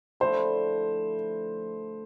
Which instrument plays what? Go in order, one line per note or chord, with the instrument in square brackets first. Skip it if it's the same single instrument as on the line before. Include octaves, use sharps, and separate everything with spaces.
[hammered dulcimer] D3 F3 A3 E4 [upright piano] C5